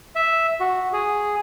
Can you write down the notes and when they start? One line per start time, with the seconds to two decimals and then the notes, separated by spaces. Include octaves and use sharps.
0.15 E5
0.60 F#4
0.93 G#4